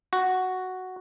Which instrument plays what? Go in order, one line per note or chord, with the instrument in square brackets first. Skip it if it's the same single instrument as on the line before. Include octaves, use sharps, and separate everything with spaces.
[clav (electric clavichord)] F#4